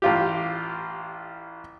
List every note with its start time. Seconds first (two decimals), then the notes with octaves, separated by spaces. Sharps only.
0.02 A1 F4 G4